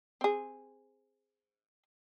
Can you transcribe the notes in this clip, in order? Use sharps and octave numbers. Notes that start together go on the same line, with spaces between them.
C4 G#4